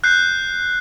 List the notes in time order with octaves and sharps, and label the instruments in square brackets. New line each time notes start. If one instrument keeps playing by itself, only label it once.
[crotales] F#6 G6 C7